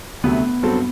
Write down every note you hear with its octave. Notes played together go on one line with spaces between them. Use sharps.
D2 C3 F#3 A3 B3
G2 F#3 C4 F#4 A4